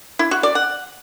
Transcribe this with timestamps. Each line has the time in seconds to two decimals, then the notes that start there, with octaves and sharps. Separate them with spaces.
0.19 E4
0.31 F#4
0.43 D5
0.55 F#5